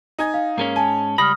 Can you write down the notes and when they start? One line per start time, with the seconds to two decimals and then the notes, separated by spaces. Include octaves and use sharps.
0.19 D#4 G#5 G#6
0.34 F5
0.58 G#2 G#3 A#3 C#4
0.76 G#5 A5
1.18 C#2 G3 B5 D#6 F6 A#6